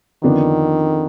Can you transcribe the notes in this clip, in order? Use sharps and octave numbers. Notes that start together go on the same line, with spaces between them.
F2 D3 D#3 F3 B3 D4